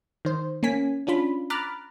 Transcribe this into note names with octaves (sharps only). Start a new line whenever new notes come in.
D#3 C5
A#3 C#4 G#5 B6
C#4 D4 F4 B5
A#5 B5 D6 F6 F#6 A6